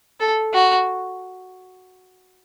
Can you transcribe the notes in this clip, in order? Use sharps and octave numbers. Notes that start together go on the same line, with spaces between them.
A4
F#4